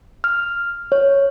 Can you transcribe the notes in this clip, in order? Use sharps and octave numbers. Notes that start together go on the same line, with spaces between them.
F6
C#5